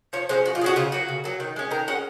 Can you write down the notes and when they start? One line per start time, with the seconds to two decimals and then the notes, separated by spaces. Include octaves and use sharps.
0.13 F3 C#5
0.29 G#3 C#4 C5
0.45 F3 F#4
0.55 F4
0.61 G#3 C#4 F#4
0.76 C#3 F4
0.92 F#3 A#3 F#4
1.09 C#3
1.24 F#3 A#3
1.40 D#3
1.56 G#3 C#4
1.71 D#3 A#4
1.88 G#3 C#4 F#5